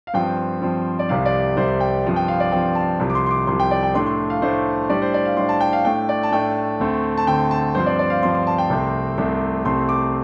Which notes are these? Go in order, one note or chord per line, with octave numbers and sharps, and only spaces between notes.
F5
G2 F3 C4 G5
G2 F3 C4
D5
C2 C3 G3 F5
D5
C2 C3 G3 C5
G5
G2 F3 C4
G5
F5
D5
G2 F3 C4 G5
A5
C2 C3 F3
D6
C6
C6
D6
C2 C3 F3 C6
G5
D5
G5
A2 A3 D4 C6
C6
F5
A2 A3 D4 C5
A2 G3 D4 D5
C5
D5
F5
A2 G3 D4 C6
A5
G5
F5
A2 A3 D4 G5
D5
A5
A2 A3 D4 G5
D2 D3 A3 C4
A5
D2 D3 A3 C4 G5
A5
G2 F3 C4 C5
D5
D5
F5
G2 F3 C4 C6
C6
A5
G5
C2 C3 A3 C4
C2 C3 A3 C4
C2 C3 A3 C4 C6
D6